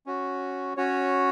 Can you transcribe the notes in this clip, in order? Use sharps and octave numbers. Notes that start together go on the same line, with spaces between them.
C#4 F#4
C#4 F#4 C#5